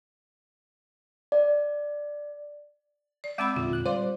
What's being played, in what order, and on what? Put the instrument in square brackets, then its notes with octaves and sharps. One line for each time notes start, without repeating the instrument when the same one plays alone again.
[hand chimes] D5
[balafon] D5
[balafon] G#3 C4 B5 [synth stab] E5 D6 E6
[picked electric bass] E2 A#2 D3 [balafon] F4
[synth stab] F#6
[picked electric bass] G3 [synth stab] C5 D5 [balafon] F5